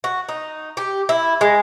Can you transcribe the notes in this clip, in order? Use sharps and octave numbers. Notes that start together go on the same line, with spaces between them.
F#4
D#4
G4
E4
G#3